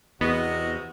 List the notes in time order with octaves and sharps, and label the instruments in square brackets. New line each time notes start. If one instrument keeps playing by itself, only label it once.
[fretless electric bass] E2 [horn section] C3 F#4 [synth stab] B3 [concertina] D#5